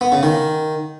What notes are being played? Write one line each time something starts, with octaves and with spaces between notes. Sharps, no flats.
B3
C#3
D#3